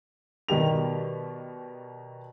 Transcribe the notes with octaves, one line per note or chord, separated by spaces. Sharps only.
B2 D#3 G3 G4 F7